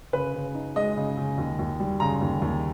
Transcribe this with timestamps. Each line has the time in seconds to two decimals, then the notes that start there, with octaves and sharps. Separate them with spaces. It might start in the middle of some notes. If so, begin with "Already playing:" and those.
0.13 C#3 B4
0.34 C#3
0.55 D#4
0.76 G#3 D#5
0.97 C#3
1.17 C#3
1.38 D#2
1.59 D#2
1.80 G3
2.00 C#3 A#5
2.21 D#2
2.42 D#2